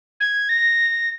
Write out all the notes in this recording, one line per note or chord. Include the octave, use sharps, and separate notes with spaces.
G#6
A#6